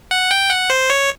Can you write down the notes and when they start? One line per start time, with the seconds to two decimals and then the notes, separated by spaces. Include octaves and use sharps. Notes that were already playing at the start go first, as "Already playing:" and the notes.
0.11 F#5
0.31 G5
0.50 F#5
0.70 C5
0.90 C#5